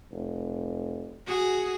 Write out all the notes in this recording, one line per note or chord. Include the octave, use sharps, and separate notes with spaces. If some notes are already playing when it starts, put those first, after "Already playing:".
F1
F#4 G#4